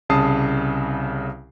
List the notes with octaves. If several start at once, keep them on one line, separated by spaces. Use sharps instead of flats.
C2 C#3 A5 D#6 C7